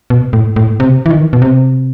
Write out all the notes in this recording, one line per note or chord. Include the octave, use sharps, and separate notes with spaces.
B2
A2
A2
C3
E3
D#3
B2
C3